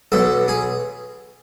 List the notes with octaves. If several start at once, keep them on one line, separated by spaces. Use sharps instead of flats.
B1 B2 A4
G#4